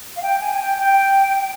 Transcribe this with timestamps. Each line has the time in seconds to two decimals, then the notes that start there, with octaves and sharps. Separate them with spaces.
0.16 F5
0.22 G5
0.41 G#5
0.56 G#5
0.60 G5
0.78 G5